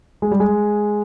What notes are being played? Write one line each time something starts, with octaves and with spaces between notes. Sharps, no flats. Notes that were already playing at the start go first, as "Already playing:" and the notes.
G#3
G3
G#3